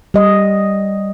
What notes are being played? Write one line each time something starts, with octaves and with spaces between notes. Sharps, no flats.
G3 D#5